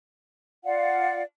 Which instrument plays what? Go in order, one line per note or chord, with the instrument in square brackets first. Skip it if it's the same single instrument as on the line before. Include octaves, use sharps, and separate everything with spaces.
[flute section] F4 D5 F5 F#5